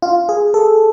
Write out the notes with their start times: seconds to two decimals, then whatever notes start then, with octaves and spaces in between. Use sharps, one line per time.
0.02 F4
0.29 G#4
0.54 A4